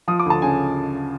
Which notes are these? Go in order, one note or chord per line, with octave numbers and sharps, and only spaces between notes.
F3 D#6
D6
D2 A5
C#3 G#5